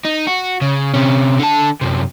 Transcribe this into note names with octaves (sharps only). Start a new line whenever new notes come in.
D#4
F#4
C#3
C3 C#4
D3 A5
F#2 C3